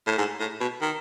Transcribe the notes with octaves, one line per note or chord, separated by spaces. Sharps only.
A2
G#2
A2
B2
D#3